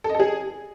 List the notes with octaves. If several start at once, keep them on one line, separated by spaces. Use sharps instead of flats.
A4
D#5
A4
G#4